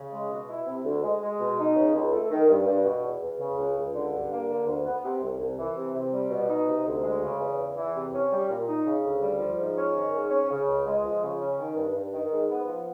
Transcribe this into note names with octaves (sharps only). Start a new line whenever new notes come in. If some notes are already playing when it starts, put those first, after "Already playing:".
Already playing: C#3
G#3
B2
E4
C3
D2
G#3
G#3
B2
D#4
C#3
C#2
A3
D#3
G2
G2
B2
E2
E2
C#3
C#2
C#2
D3
G2
A#3
D3
D2
B3
C3
C2
C2
E3
C3
C3
G3
B2
D#4
C3
D2
G#3
C#3
E2
E2
E3
C3
C#4
G3
A#2
D#4
C#3
D2
G3
F3
G#2
C#4
D#3
G#2
C#4
C#3
C#2
G#3
F3
C#3
C#4
D#3
G2
G2
D#3
G#2
B3
F3